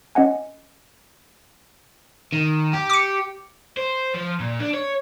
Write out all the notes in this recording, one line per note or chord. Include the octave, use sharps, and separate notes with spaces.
C#4 D#5 F#5 G#5
D#3
G4
D6 C#7
C5
F3
A#2
D4
C#5